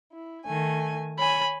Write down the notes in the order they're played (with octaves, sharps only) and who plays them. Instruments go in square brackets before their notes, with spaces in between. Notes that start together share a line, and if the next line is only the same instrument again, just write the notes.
[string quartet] E4
D#3 A3 G#5
[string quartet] C#5 G#5 [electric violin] B5